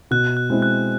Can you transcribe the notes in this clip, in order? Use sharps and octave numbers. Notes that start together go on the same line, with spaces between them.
B2 F#6
F#6
G#3 C4 E4
F#6